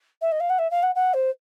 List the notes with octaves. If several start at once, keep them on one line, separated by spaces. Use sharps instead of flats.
E5
D#5
F5
F#5
E5
F5
F#5
F#5
C5